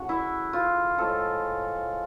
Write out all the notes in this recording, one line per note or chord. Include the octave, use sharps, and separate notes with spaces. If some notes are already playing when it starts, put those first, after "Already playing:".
Already playing: C#3 E3 A3 F#4
E4
F4
A2 F3 G#3 A4